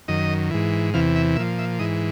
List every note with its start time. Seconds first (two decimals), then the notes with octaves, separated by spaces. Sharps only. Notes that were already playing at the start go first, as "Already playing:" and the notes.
0.08 F#2 D#3 D#5
0.51 G#2 E3
0.94 E2 C3 E3 F5
1.16 E5
1.36 A#2 F3 E5
1.59 E5
1.79 G#2 E3 D#5